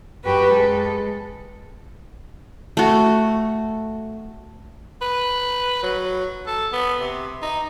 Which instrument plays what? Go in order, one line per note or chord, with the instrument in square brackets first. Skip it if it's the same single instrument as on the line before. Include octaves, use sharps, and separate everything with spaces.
[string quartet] F#2 F#4 G4 B4
G#3 A4
[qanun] A3 F#4
[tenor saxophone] B4
F#3
A4
B3
C3
D#4